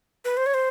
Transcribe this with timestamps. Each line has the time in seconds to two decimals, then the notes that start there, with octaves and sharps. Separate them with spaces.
0.25 B4
0.37 C5
0.46 C#5
0.54 C5